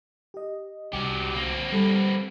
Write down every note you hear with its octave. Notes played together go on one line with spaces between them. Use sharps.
G4 D#5
C2 F#3 G4
A#3 C4
G3 A4 B5